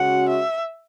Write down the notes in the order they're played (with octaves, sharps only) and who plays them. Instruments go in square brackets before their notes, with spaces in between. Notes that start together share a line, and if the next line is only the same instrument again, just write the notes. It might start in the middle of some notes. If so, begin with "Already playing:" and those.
Already playing: [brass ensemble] C#3 G#3 C#4 F#4 [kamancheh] F#5
[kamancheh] E5